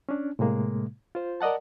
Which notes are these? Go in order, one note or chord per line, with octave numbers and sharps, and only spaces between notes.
C#4 D4
A2 C3 G#3 A#3
F4 C5
A#4 D5 D#5 F#5 A5